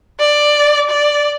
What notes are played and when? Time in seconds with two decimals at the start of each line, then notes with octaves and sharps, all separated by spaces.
0.19 D5
0.89 D5